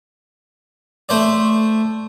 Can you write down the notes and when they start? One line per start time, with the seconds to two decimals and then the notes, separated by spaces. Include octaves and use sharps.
1.09 A3 C5 D5